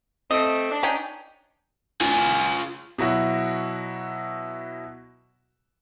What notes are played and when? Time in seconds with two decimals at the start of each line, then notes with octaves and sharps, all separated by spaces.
0.31 A3 C4 D#5
0.71 D4
0.83 C#4 D#4 G5
2.01 F4 G#4
2.98 B2 F#3 E4 F#4